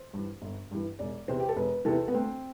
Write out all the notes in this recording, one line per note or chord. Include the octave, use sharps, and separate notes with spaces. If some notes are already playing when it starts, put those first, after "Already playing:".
Already playing: C5
G2 E3
G1
G2 E3
E1 D5
E2 C3 E3 C5
G4
A4
E1 B4
E2 C3 E3 A4
B3
D2 C4